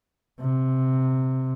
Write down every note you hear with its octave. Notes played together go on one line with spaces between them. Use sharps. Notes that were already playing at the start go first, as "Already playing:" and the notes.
C3